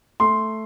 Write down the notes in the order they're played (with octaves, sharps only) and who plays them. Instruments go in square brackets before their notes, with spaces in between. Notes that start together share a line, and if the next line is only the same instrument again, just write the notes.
[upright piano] A3 C6